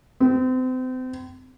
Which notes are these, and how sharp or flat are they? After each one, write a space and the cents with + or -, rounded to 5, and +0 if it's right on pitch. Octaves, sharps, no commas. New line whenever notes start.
C4 -35